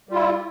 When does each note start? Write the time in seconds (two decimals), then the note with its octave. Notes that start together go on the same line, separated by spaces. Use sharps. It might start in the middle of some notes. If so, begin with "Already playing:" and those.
0.09 G3
0.12 F4
0.15 E4